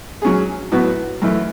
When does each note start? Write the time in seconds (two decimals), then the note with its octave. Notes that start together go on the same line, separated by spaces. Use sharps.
0.22 F#3 C#4 G#4
0.71 A2 F#3 B3 F#4
1.22 F#2 E3 A3